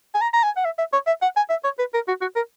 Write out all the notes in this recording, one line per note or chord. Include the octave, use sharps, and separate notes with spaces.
G#5
A#5
A#5
G#5
F#5
E5
E5
C#5
E5
F#5
G#5
E5
C#5
B4
A#4
F#4
F#4
A#4